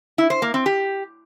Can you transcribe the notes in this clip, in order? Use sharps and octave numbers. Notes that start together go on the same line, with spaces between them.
E4
C5
A#3
C4
G4